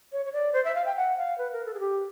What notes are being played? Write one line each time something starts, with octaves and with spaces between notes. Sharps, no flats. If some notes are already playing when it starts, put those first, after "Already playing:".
C#5
C#5
D5
C5
E5
F5
G5
F#5
F5
B4
A#4
A4
G#4
G4